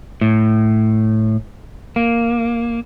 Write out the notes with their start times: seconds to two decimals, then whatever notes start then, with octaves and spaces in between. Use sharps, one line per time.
0.21 A2
1.96 A#3